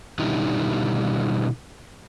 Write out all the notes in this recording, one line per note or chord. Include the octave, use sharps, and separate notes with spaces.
B2 D3 D#3 G3 D#4 E4